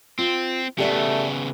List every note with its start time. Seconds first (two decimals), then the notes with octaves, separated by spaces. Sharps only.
0.19 C4 F4
0.78 C#3 A3 B3 G4 D5 E5